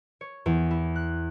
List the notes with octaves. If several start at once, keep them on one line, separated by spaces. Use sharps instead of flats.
C#5
E2
E4
F#6